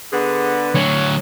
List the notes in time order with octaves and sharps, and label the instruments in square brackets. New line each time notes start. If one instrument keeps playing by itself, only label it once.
[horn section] D3 B3 [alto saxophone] G#4
[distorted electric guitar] D2 F#3 [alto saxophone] C#5